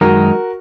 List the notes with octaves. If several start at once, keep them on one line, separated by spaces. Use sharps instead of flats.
F#2 D#3 G#3 D#4 F#4 A#4